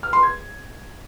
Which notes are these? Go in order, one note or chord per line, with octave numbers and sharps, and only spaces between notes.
F6
C6
G#6